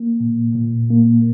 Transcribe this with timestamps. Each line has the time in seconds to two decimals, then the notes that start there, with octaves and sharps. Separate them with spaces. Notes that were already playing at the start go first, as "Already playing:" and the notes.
Already playing: A#3
0.20 A#2
0.55 A#2
0.90 A#3